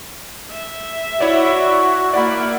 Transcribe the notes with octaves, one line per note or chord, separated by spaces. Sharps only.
E5
E4 F#4 C#5 D5
A#3 E4 D5 F#5 B5